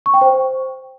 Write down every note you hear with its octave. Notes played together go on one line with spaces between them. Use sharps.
C#6
G5
C5